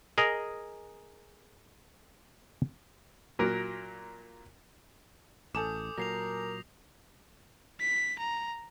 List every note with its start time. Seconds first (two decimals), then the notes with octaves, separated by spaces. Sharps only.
0.18 G#4 A#4 D#5 G#5 A#5
3.39 A#2 F#3 A#4
5.55 A1 A4 G#5 D6 D#6 G6 E7
5.98 A#2 F#3 A#4 A#6 C7 F7
7.80 B6
8.19 A#5